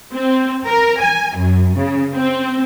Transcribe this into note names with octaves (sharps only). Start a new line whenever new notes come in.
C4
A#4
G#5
F#2
C#3
C4